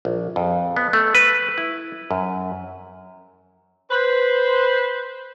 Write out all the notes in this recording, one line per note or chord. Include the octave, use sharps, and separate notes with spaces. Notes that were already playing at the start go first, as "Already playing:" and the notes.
A#1
F2
B3
A3
B4
E4
F#2
B4 C5